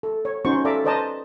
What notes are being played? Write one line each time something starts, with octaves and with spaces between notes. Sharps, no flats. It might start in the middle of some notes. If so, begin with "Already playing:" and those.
A4
C#5
C#4 D#4 F#4 C5 C#6
A4 D5 E5 F5 A#5 D6
B4 C5 D5 D#5 A5 A#5